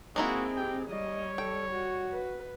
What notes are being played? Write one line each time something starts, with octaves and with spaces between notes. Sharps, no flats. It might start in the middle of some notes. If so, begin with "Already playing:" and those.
G#3 A#3 C4 D#4 E4 F#4 G#4
G4 G5
G3 C#5 D#5
A4 G5
F#4
B4